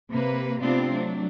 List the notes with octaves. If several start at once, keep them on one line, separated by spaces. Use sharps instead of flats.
C3 A#3 B4
C3 A3 B3 C4 D4 F4
F#3 A3 D4